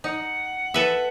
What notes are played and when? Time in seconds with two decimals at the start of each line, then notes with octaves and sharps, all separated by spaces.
0.04 D#4 F#5
0.74 A4 B4 E5